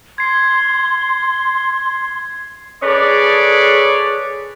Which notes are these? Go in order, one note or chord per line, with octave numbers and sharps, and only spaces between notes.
C6 G#6 C7
G#4 A4 B4 C#5 D5